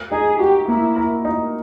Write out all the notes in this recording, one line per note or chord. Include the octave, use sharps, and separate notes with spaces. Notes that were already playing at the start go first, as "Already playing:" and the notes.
Already playing: A#4
D#4 G#4
F#4 G4
A#3 E4
A#4
D#4